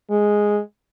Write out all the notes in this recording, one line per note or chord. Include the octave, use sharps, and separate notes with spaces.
G#3